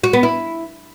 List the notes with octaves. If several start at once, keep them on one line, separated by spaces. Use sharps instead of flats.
F#4
B3
E4